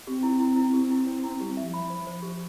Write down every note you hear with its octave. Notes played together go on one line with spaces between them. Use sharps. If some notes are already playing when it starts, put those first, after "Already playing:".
C4 G4
E4
E4
E4
C4 G4
E4
C5
E4
G3 G4
F3 E5
B5
F3
C5
F3 C5
G4